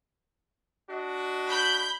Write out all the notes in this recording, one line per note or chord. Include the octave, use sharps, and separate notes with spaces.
D4 F#4 D#5
B5 G6